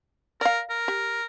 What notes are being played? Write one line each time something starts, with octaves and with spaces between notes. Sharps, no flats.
A#4 D5 F5
A#4
G4